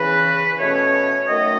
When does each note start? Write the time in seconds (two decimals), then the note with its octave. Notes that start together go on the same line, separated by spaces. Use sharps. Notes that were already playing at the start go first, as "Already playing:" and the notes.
Already playing: E2 C#3 E3 B4
0.58 B2 A3 C#4 C#5
1.27 F#2 D#3 A3 D#5